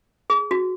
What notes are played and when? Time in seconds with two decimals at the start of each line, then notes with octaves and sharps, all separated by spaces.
0.30 G#4
0.51 F#4